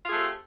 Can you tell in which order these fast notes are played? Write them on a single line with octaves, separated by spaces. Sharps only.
F4 G#4 A3 C4 G4